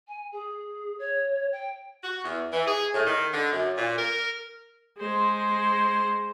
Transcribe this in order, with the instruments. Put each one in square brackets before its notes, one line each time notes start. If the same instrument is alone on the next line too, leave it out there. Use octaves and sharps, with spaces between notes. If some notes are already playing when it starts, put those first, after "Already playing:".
[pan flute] G#5
G#4
C#5
G5
[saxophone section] F#4
E2
E3
G#4
A2
D#3
D3
F#2
A#2
A#4
[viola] G#3 C5